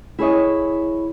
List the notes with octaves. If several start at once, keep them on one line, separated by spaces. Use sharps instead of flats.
E4 G#4 C#5 D#5